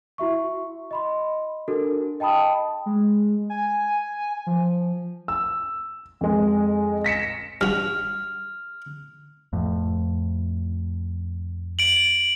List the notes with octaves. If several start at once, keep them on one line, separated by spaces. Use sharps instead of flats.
E4 F#4 E5 C#6
D#5 B5 C6
D4 F#4 A4 A#4
D#5 G5 A5 B5 D#6
G#3
G#5
F3
E6
F2 G#3
A#6 B6 C#7 E7
G2 F#4 F6
F2 A2
D7 F#7